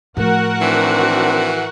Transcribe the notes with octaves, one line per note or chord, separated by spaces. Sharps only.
A2 F3 F#4 A#4 F#5
D#3 E3 C4 D4